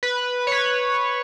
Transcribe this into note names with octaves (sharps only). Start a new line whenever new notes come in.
B4
C#5
B4